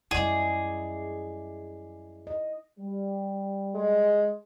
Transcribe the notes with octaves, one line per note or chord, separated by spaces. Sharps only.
F#2 G3 E4 G#4 D5 D#5
D#5
G3
G#3